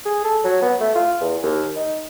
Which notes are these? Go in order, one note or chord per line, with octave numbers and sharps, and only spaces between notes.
G#4
A4
F#3
B3
A3
F4
E2
D#2
D#4